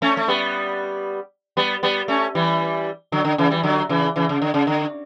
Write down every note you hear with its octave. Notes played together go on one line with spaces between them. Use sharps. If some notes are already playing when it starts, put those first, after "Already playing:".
A3 C#4
A3
G3 B3
G3 B3
G3 B3
A3 C#4
E3 G3
D3 F#3
D3
C#3 E3
E3 G3
D3 F#3
C#3 E3
C#3 E3
C#3
D3
C#3
D3